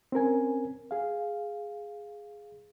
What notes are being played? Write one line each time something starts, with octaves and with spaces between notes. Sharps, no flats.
C4 C#4 A#4 G#5
G#4 F5